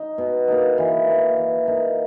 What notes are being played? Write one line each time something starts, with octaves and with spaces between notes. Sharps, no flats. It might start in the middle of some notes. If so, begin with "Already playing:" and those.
Already playing: D#4
B2
A#3 D#4
E3
A#3 D#4
E3
A#3 D#4